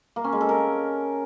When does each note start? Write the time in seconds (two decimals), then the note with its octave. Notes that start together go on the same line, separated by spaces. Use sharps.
0.16 A#3
0.24 C#4
0.33 G#3
0.41 A4
0.49 A#4